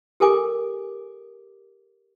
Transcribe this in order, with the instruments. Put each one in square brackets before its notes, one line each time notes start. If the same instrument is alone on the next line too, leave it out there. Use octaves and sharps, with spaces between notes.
[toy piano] G4 A4 A#4 G#5 D6